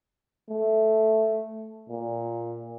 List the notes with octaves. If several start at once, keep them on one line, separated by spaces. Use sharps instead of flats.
A3
A#2